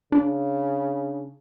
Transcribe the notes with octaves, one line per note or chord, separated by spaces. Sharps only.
C#3 D4